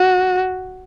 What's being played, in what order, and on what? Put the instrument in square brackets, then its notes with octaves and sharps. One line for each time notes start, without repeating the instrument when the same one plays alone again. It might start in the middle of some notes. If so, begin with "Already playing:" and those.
Already playing: [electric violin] F#4